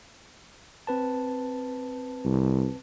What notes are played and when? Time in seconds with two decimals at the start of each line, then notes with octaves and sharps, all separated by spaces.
0.87 C4 B4 A5
2.25 C2